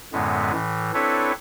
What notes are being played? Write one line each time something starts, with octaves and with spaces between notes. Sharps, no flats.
F#2 A2 D3 G#3 B3
A2 E3
C4 D4 E4 A4 B4 C#5